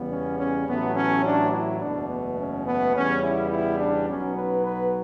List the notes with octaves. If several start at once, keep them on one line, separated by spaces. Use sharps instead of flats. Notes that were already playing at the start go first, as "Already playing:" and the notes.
Already playing: E2 C#3 G3 B3
C#4
C#4
A1 A2 F#3 A3 B3
C#4
D4
E4
F#1 E2 B2 A3 D4
B3
C#4
B3
E2 C#3 G3 B3 C#4
E4
E4
D4
B1 B2 F#3 B3 C#4
B4
B4